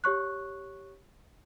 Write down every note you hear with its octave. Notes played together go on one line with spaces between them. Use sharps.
G4 C#5 C#6 F#6